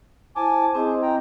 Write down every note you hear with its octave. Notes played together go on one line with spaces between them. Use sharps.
E4 C5 G#5 A5 D6
C4 E4 G#4 C5 D#5
G5 A#5